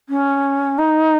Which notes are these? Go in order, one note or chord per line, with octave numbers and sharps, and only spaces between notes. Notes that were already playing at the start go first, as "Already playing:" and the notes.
C#4
D#4